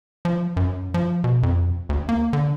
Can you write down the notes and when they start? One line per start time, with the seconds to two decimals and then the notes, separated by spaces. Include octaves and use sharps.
0.25 F3
0.57 F#2
0.94 F3
1.24 B2
1.43 F2
1.89 D2
2.09 A#3
2.33 D3